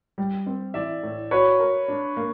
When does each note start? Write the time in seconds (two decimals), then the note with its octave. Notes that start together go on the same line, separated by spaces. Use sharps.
0.18 G3
0.46 C4
0.74 E3 D5 E5
1.03 A2
1.31 F#4 B4 C#5
1.60 A#4
1.88 D4
2.17 A#3